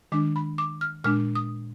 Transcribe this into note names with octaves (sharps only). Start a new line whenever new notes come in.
D#3 G#3 D4 D6
B5
D6
F6
A#2 G#3 D4 F6
D#6